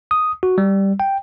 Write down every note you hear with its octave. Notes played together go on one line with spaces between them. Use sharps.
D#6
F#4
G3
G5